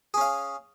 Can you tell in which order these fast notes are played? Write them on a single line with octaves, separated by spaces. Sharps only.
G#4 C#4 F5